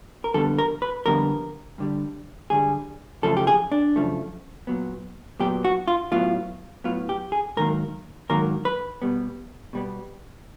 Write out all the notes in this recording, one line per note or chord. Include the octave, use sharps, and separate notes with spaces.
A#4
F2 D3 G3 B3 A4
A#4
B4
F2 D3 G3 B3 A#4
G2 D3 G3
G2 D3 G3 G#4
F#2 C#3 F3 A3 A4
G4
G#4
D4
F#2 C#3 F3 A3
A#2 F#3 B3
A#2 F#3 B3 G4
F#4
F4
A2 F#3 B3 F4
A2 F#3 B3 F4
G4
G#4
G#2 D#3 F#3 A#3 A#4
G#2 D#3 F#3 A#3 A#4
B4
B2 G3 B3
B2 G3 B3